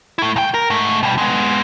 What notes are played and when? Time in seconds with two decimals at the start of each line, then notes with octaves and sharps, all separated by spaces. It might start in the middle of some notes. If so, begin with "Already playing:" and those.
0.18 A3 E4
0.36 C2 G5
0.54 A#4
0.70 G#2 A3
1.03 B2 G3
1.18 G#3 B3